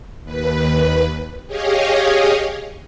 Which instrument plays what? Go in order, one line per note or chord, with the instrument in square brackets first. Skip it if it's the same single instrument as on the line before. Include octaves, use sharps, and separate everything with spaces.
[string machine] D#2 B4
G4 G#4 C#5 D#5 F5